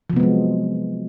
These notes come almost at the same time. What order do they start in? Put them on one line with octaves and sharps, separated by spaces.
F3 C3 B3 G#3 F#3